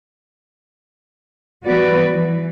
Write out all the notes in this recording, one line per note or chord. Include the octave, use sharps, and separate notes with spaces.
E3 G3 B3 F#4 B4 D5
E3